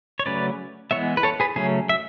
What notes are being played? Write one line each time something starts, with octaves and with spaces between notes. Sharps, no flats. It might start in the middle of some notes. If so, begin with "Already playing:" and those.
C#5
C#3 F#3 A3 C#4 B4 D5
E3 G#3 B3 C#5 E5
B4
A4 C#5
G#4 B4
C#3 F#3 A3 C#4 G#4
E5